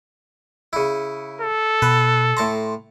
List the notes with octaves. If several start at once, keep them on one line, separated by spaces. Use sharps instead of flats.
C#3 E4
A4
B2 B4
A2 A5 A#5 C6